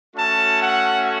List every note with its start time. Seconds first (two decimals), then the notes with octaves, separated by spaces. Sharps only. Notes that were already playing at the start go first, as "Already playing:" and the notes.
0.15 A3 C#4 F#4 A5
0.59 F#5